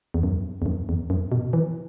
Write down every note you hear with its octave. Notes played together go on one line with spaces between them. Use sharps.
E2
F#2
E2
F#2
E2
F#2
B2
E3